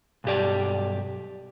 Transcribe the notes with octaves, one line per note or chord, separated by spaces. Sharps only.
B1 G2 G4 D5